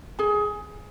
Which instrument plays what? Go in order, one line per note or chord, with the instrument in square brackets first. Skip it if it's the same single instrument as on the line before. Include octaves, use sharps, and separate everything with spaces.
[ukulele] G#4 G#5